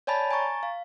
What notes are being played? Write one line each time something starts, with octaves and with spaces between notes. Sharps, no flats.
C#5 D5 G#5 A5 B5 A6
G#5 A#5 C#6 A6
F5